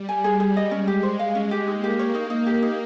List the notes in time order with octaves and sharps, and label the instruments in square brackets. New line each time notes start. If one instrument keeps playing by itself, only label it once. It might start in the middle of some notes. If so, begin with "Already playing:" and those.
Already playing: [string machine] G3
[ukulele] G#5
G#4
G#4
D#5
[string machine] G#3 [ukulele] C#4
[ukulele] G4
C5
F5
C#4
G4
[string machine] A#3 [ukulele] D#4
[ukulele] G4
C#5
D#4
D#4
G4
D#4